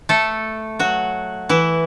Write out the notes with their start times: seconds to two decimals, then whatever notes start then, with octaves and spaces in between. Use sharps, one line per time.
0.09 A3 A4
0.79 F#3 F#4
1.49 E3 E4